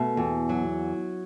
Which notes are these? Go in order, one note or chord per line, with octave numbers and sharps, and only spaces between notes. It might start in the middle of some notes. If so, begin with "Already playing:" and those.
Already playing: B2 A3
E2
F#3